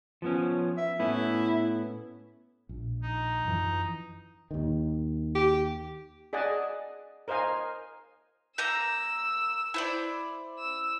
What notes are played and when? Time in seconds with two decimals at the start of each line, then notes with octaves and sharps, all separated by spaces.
0.22 F3 B3 C#4
0.78 E5
0.99 A2 B3 C#4 E4
2.69 A#1
3.02 D#4
3.46 F#2 E3 F3
4.51 D#2 D#3
5.35 G4
6.33 G#4 D5 D#5 F#5 G#5 A5
7.28 A#4 C5 D#5 F5 G#5
8.58 A#3 A#5 E6 G6
9.74 E4 C5 D5
10.59 E6